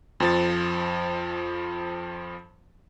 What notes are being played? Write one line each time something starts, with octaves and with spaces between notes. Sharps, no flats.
F2 F3 A6